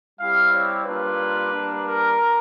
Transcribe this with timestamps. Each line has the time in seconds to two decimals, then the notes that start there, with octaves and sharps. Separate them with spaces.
0.19 G3 C4 E4 G4 F5
0.52 C#5
0.85 G3 A#3 D4 F4 B4
1.51 G3 A#3 D4
1.85 A#4